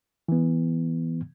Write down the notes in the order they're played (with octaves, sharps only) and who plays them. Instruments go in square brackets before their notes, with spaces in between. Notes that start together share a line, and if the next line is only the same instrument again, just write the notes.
[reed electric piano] E3 B3